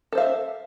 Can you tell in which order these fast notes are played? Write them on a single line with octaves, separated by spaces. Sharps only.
A4 C5 F5 E5